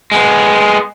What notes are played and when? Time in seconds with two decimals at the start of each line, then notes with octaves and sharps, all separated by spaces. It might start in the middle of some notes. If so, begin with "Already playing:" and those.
0.12 G#3 B3